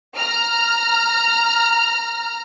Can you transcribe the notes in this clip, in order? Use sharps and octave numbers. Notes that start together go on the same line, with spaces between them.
A#5 F6